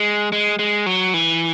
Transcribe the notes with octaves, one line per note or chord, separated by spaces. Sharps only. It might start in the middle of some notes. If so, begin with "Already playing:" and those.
Already playing: G#3
G#3
G#3
F#3
E3